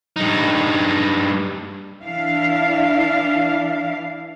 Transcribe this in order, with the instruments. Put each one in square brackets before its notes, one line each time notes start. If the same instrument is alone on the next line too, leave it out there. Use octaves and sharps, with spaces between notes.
[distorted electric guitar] G2 D#4
[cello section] E3 D4 E4 F5